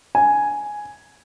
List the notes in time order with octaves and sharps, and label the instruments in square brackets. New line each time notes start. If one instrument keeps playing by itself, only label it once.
[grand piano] G#5